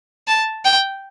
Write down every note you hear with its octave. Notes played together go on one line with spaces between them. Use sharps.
A5
G5